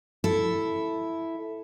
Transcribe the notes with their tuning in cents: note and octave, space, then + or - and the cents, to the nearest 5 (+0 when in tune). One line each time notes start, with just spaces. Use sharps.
E4 +0 A4 +0